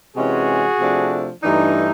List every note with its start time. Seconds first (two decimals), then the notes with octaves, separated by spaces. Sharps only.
0.16 C3 E3 G#3 C#4 F#4 G#4
0.80 C3 F3 A3 D4
1.43 G2 E3 A3 D4 D#4